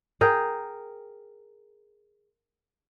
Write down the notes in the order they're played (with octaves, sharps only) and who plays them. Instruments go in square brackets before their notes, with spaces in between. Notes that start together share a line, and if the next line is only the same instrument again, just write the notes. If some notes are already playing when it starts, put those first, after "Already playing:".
[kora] G#4 A#4 G5